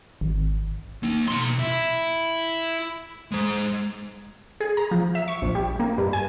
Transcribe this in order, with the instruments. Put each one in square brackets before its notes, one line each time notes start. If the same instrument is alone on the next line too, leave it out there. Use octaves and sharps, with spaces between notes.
[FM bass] G#1
[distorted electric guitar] A#3 D#4
B2 C6
E4
G#3 C5
[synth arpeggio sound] G#4
A#5
F3
E5
C#6
A#1
G3
A#3
G2
G#5